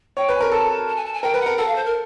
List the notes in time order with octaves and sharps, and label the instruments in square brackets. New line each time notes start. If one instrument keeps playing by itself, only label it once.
[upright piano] C#5 [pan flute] G5
[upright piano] B4
[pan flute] G#5
[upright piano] A#4
[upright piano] A4 [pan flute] A5
[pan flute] A5
G#5
A5
G#5
[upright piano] A#4 [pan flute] G5
[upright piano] B4
[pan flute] F#5
[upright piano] A#4
[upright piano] A4 [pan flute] F#5
[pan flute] F5
C5
A#4